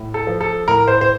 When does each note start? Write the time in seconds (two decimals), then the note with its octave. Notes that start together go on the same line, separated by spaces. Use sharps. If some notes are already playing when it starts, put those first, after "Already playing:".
Already playing: A2
0.14 A4
0.27 F3
0.41 A4
0.68 A2 A#4
0.88 C5
1.01 C5